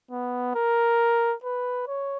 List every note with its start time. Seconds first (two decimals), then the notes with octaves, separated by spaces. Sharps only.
0.11 B3
0.55 A#4
1.43 B4
1.87 C#5